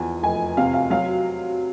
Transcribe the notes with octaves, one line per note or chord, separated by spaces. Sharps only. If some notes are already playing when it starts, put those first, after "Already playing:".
Already playing: E2 F3 G#5
F1 G#5
C3 F5
F5
F#3 F5